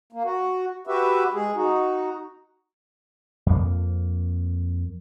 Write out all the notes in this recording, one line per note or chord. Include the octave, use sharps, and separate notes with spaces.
A#3
F#4
F#4 G4 B4 E5
G#3 G#4
D#4 F#4
F2 A#3